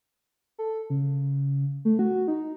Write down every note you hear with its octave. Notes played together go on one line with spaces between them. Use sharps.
A4
C#3
A3
F#4
D#4